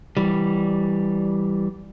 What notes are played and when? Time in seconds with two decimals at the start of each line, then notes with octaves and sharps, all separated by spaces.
0.17 E3 G3